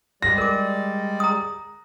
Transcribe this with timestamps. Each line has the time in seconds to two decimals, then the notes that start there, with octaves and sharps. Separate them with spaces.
0.22 G3 G#3 D5 A#6
0.38 A#4 D6
1.20 A#5 D#6